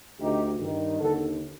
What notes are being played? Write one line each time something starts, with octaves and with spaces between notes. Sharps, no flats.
D2 D3 D#4 G4
G2 D#3
D#2 D3 F#4 A4